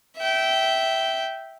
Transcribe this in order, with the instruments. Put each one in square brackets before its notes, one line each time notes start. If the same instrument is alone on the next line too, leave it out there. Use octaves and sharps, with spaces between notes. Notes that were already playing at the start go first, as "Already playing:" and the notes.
[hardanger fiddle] E5 G5